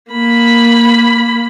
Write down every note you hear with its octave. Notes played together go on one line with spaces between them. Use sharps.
A#3 B5